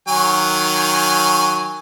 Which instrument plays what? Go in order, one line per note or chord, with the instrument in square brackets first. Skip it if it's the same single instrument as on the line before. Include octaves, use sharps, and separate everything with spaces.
[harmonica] D#3 F#3 G#5